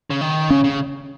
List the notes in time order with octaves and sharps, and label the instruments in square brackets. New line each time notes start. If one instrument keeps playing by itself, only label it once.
[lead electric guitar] C#3
D#3
[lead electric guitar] C#3 [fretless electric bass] C#4
[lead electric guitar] C#3